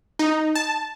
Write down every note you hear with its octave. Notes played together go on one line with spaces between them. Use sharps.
D#4
A5